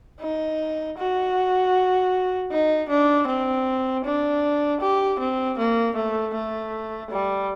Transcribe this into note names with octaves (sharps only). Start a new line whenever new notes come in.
D#4
F#4
D#4
D4
C4
D4
G4
C4
A#3
A3
A3
G3